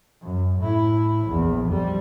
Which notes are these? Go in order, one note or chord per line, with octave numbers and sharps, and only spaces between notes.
F#2
A2 E4
A#1 E2
F2 G3